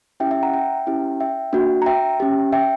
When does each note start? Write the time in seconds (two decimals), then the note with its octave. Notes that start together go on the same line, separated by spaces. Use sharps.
0.20 C#4 E4 G4 E5 G5
0.31 E5 G5
0.43 F#5 A#5
0.53 E5 G5
0.87 C#4 E4 G4
1.20 E5 G5
1.53 A#3 D4 F#4
1.82 A#5
1.86 E5 G5
2.20 C#4 G4
2.53 E5 G5